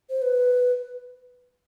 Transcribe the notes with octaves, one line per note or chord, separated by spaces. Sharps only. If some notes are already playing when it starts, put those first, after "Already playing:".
C5
B4